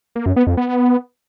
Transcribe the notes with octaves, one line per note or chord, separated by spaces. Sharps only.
A#3
F#2
B3
F2
B3